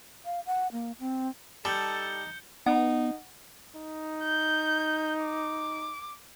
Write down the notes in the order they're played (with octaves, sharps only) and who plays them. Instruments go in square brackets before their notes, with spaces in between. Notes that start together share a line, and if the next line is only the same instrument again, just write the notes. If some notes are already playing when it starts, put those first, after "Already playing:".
[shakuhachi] F5
F#5
A#3
C4
[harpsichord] G3 [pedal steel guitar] D#4 A5 [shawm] A4 [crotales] G6 C#7 G7
[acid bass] B3 [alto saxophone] D#4 [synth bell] F#5
[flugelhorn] D#4
[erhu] G6
D6